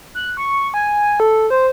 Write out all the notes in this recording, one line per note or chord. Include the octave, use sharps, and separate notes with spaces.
F#6
C#6
G#5
A4
C5